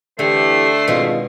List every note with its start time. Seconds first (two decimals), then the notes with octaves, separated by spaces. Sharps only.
0.19 D3 E3 A3 G4 C5
0.88 G#1 B2 G#3 F4